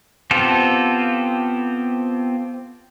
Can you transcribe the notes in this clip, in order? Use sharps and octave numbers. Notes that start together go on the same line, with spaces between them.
B3 C4 F4 G4 A4